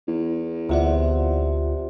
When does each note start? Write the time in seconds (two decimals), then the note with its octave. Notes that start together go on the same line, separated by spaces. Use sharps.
0.08 E2
0.69 D2 C3 F4 D5 F#5